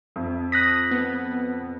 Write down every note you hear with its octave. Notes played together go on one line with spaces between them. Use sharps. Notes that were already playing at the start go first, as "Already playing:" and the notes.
F2
D#6 F#6 A#6 B6
B3